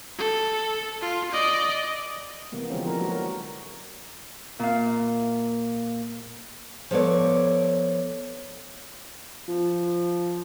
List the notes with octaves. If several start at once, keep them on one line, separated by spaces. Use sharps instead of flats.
A4
F4
D5 D#5
C3 E3 G3 A#3 B3
D3 E3 F3 G#3 C4 C#4
F3 D4 A#4
F#3 A#3 F#4
A#4
A#2 F5
F3 B3 A4 C#5 D5
F3